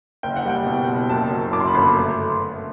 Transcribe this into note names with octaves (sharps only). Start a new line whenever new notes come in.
F#1 G5
F#5
G3 G5
B2
F#1
F#2 A5
F#3
F#2 D6
C6
B5
G1 C6
A3